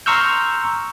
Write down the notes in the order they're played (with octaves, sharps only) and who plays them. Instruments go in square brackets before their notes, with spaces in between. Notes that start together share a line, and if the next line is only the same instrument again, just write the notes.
[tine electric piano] A#5 C6 C#6 E6 F6 G6